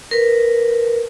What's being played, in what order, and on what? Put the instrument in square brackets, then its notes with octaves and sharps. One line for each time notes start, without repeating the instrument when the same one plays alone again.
[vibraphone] A#4 B4